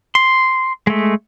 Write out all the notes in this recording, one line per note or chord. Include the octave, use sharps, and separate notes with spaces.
C6
G#3 A3